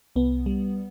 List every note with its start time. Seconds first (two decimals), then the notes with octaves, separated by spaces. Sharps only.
0.16 C2 B3
0.46 G3